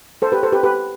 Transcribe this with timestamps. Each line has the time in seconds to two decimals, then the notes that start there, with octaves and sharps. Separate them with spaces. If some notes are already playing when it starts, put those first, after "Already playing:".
0.22 A4 C5
0.32 G4 B4
0.43 A4 C5
0.53 G4 B4
0.63 G4 B4